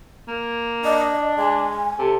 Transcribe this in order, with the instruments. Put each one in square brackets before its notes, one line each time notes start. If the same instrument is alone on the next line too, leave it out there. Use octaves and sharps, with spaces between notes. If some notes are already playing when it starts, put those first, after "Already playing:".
[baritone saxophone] A#3
[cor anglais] D4 [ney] D#5
[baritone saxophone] G#3 [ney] G#5
[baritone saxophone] C3 [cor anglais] A4